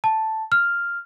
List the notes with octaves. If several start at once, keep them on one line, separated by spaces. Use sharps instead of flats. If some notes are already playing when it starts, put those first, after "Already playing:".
A5
F6